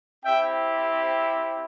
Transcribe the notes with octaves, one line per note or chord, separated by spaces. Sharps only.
C4 E4 G4 E5 G5